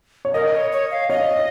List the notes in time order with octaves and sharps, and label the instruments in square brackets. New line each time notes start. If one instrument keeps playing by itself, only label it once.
[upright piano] C#5
[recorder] A#4 [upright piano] D#5
[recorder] C#5
C#5
F5
[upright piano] C#5 F5 [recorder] D#5